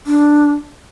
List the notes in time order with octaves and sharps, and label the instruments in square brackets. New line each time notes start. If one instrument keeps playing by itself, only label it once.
[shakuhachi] D4